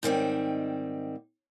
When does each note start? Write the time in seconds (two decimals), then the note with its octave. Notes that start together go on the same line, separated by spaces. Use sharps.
0.03 G#2 D#3 G3 C4